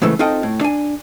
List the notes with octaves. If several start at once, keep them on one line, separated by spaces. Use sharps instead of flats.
G#2 C#3 E3 A3
C4 D#4 F4 A4 D#5 G5
A2
D4 G#5